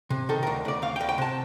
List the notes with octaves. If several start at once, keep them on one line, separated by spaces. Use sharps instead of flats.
C3
D#3 A4
A#4
D2
D2 D5
D2 F5
G5
D2
G5
C3 A5